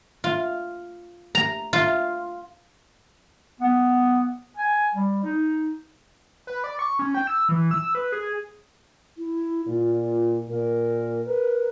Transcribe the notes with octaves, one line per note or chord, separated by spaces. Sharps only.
F4
A#5
F4
B3
G#5
G3
D#4
B4
D5
C#6
C#4
G5
E6
E3
E6
B4
G#4
E4
A#2 F4
A#2 A#4
A#4 B4